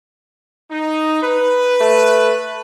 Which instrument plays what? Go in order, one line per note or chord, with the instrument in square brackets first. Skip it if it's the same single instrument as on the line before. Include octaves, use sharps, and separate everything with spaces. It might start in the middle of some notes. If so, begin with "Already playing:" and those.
[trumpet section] D#4
B4
[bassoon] A3